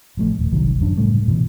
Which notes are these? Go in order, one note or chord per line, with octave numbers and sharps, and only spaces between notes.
A1 F3 A3
D#1
G1 C2 D#3 F#3
D1 F#2 D4
A2 C#3 G3 A3
G2 B2 D3 E3